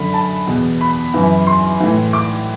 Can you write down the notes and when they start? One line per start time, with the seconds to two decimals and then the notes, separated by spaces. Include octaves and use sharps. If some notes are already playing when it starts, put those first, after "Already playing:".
Already playing: F#2 D3 B5
0.14 A5
0.47 E2 B2
0.81 B5
1.14 F#2 E3
1.47 C6
1.80 A2 E3
2.13 D6